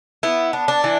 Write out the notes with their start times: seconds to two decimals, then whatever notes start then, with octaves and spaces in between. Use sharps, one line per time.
0.23 B3 E4
0.53 D4
0.68 D4
0.84 E3